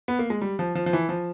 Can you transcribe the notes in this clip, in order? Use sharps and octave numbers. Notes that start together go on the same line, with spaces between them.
B3
A#3
G#3
G3
F3
F3
F3
E3
F3